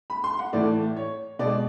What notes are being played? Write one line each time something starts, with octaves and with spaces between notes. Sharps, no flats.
B5
C6
F#5
A2 E3 A3 D5
C#5
B2 G#3 D5